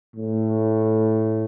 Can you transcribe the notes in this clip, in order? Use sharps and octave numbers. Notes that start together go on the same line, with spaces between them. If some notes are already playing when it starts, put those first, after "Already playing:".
A2